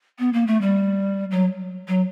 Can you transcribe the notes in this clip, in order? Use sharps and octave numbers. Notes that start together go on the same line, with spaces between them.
B3
A#3
A3
G3
F#3
F#3